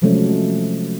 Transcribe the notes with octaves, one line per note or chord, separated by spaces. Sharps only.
C3 F3 F#3 G#3 A3 C#4